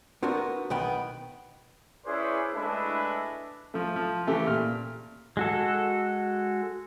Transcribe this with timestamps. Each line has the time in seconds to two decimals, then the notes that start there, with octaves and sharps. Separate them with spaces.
0.23 B3 C4 D4 E4 F#4 A#4
0.70 B1 D#3 B3 G5 B5
2.06 C#4 E4 G#4 B4 C5 D5
2.53 G#3 A3 D4 E4 A4 B4
3.74 F3 A3
3.96 F3
4.27 C#3 E3 A3 G4
4.47 A#2 F6
5.37 G#3 F#4 A4